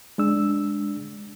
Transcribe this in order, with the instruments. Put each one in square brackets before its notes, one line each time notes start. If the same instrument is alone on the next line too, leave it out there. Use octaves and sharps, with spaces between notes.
[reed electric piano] G#3 D4 E6